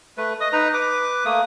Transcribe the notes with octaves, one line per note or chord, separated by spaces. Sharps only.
A3 B4
D#5 D#6
D#4 B4 A#5
B4 D6
A3 A#3 D#6